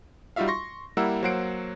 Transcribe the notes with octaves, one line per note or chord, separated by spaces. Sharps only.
G3 D#4 F4 F#4 E5 F5
C6 C#6 A#6
G3 A#3 E4 F#5 A#5 E6
F#3 A#3 C5 F#5 C7 D7